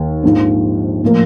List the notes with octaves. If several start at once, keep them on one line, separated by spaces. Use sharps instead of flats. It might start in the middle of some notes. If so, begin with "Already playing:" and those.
Already playing: D#2
A#1 G#2 F3
A2 F3 A#3